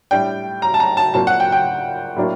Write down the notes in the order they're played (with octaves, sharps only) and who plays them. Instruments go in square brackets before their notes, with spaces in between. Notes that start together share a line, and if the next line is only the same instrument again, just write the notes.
[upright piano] A2 G3 D4 G5
A#5
A5
A#5
A5
A#2 F#3 C4 A5
F#5
G5
G5
A2 F#3 A#3 D4